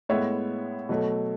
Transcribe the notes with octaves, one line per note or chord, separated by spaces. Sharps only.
A2 G#3 B3 C#5 E5
B2 F#3 A3